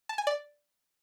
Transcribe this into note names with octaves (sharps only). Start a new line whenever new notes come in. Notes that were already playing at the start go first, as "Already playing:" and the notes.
A5
G#5
D5